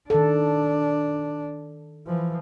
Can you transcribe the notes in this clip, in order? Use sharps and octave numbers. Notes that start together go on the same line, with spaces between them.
D#3 D4 A4
E3 F3